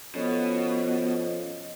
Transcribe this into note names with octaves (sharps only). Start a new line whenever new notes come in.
B2 F3 C#4 A4 C#5 D#5